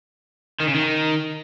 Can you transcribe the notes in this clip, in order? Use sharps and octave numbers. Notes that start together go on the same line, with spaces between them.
D#3
C#3
D#3